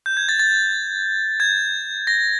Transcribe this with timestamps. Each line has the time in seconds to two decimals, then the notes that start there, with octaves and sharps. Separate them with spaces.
0.06 G6
0.17 G#6
0.29 A6
0.39 A6
1.40 G#6
2.07 A#6